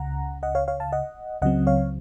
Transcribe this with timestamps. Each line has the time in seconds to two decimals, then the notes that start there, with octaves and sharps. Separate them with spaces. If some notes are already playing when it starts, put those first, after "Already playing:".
Already playing: C#2 C#3 F#5 A#5
0.43 D#5 F#5
0.55 C#5 F5
0.68 C#5 F5
0.80 F5 A5
0.92 D#5 F#5
1.42 C#2 C#3 F#3 C4 D#5 F#5
1.67 C#5 F5